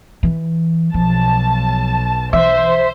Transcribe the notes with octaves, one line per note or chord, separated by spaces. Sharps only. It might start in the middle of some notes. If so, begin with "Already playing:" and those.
E3
B1 F3 A5
E3 C5 E5